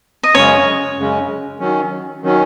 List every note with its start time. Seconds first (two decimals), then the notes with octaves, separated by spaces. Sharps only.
0.23 D#5
0.34 F#2 C#3 G#3 C#4 C#5
0.96 F#2 C#3 G#3 C#4
1.59 D#3 F#3 C#4
2.22 D#3 F#3 C#4